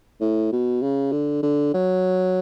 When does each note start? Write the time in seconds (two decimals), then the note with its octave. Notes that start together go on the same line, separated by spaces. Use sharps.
0.21 A2
0.52 B2
0.82 C#3
1.12 D3
1.43 D3
1.74 F#3